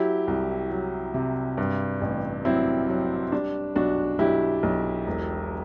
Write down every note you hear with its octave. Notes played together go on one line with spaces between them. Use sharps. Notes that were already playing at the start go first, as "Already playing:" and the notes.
Already playing: F#3 E4 G4
C2
F#3
C3
G2
A1
F#3 C4 E4
F#3
G3 D4
B1 D4 F#4
B1 E4 G4
B1
E1